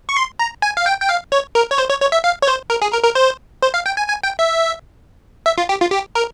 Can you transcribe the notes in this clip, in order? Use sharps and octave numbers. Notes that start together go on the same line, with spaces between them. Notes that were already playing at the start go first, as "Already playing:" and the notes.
C#6
C6
A#5
G#5
F5
G5
G5
F5
C#5
A#4
C#5
C5
C#5
C#5
E5
F5
C#5
C5
A#4
G#4
A#4
A#4
C5
C5
F5
G5
G#5
G#5
G5
E5
E5
F4
G4
F4
G4
A#4